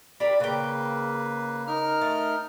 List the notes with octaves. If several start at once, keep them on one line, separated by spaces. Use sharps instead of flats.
D4 G4 A#4 B5
C#3 A#3 B4 G5
D#4 A#4 F6
A3